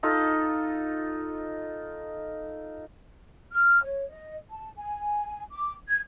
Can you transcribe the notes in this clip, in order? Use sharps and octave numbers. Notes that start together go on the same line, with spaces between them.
D#4 F4 A4
F6
C#5
D#5
A5
G#5
D6
G#6